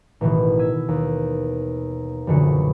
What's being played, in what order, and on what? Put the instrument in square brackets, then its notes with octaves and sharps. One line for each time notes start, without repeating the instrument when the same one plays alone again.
[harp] A1 B2 D#3 E3
E6 G#6 B6 D#7
D#2
E1 A#1 F#2 D3 F#4 C#7